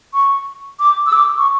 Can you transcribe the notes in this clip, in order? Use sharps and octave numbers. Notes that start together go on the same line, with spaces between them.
C#6
D6
E6
D6
C#6